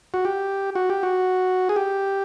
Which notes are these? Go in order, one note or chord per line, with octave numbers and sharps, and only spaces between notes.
F#4
G4
F#4
G4
F#4
G#4
G4